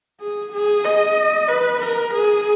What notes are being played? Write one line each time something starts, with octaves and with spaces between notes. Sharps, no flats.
G#4
G#4
D#5
B4
A#4
G#4